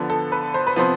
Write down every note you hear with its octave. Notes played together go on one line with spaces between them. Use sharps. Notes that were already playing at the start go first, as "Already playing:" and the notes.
Already playing: D3 F3 B3
A4
B4
C5
B4
C3 F3 B3 C5